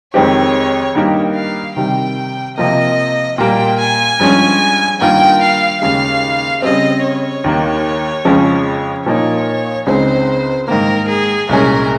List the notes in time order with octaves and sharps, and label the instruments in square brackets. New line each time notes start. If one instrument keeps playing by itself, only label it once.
[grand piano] F2 D#3 G#3 C4 G4 [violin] C#5
[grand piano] G2 D#3 A#3 D#4 G4
[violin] F5
[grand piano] C3 D#3 G3 [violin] G5
[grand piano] C3 F3 A#3 [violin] D#5
[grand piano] A#2 G3 A#3 [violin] G5
[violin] G#5
[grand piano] G2 F3 G#3 C#4 G#4
[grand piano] G2 D#3 A#3 F4 A#4 [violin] G5
[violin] F5
[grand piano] D#2 C#3 G#3 [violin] F5
[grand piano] C#3 G3 C4 [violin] D#5
[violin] C#5
[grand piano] D#2 D#3 A#3
F2 C#3 F3 G#3 C#4
[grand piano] A#2 F3 A#3 D#4 [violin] C#5
[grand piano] C#2 C#3 G#3 C4 D#4 [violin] C5
[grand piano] G#2 D#3 A#3 [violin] A#4
[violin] G#4
[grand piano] C2 A#2 G#3 C#4 G#4 [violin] A#4